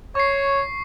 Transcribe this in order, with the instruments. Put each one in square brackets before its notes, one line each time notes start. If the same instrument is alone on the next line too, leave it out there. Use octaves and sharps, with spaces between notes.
[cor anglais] C#5 [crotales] C#6 C7